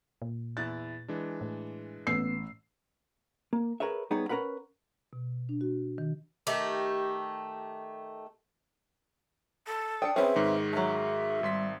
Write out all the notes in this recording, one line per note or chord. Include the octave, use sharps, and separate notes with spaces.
A#2
E2 E4 F#6 A6
E3 G#3 D4
A2
A1 B3 E6 C7
A#3
G#4 A#4 B4 C#5 E5
G3 B3 D#4 G#4 C#5
C#4 A#4 B4 F#5 B5
B2
D4
F#4
D#3
D#3 A3 G4
A4
D4 G5 D#6 C#7
C4 C#4 G#4 B4 E5
G#2 D#3
F3 F#3 E5
G#1 G3 C6 B6